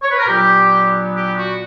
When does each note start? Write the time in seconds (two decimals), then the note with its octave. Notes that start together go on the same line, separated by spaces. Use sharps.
0.02 C#5
0.10 B4
0.18 A#4
0.26 A#2 F#3 B3 D4 G4
1.16 G4
1.37 F#4